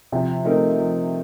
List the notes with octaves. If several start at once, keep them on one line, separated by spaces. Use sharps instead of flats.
C3 F3
A3 C4 D#4 A#4
F3